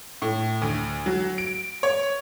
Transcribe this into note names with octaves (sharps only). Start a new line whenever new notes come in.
A2
D2
F#3
D7
C#5